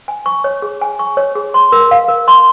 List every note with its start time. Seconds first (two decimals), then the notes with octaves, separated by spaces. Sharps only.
0.08 G#5
0.26 C#6
0.44 C#5
0.62 G#4
0.81 G#5
0.99 C#6
1.17 C#5
1.35 G#4
1.54 C6
1.72 A#4
1.91 F5
2.08 A#4
2.28 C6